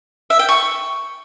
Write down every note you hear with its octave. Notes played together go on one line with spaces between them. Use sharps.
E5
G5
C#6